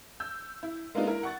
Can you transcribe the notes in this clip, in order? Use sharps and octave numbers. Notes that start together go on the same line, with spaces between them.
E6 G6
E4
G#3 A#3 B3 D4 D#4 F4
E4 A#4
F#5 C#6 A6